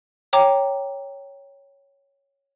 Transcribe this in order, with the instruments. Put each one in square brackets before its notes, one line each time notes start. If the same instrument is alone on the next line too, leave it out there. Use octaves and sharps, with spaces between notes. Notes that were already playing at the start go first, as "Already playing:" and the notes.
[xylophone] C#5 G5 A#5 D6